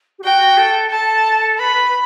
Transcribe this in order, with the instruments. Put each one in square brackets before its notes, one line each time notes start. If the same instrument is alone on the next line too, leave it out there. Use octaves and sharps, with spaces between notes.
[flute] G4
[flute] F#4 [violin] G5
[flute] A4
[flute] A4 [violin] A5
[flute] B4 [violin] B5